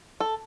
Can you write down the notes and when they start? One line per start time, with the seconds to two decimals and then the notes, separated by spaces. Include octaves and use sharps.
0.20 A4